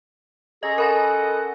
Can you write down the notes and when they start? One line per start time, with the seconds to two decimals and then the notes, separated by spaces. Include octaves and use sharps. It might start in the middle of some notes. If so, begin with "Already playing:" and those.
0.63 C#4 G#4 A4 D#5 A#5 C6
0.78 A4 A#4 D#5 F#5 A5 B5 D#6 A#6